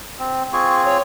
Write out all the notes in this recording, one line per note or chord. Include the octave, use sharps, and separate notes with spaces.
C4
C4 F4 G#4 C#6
C#5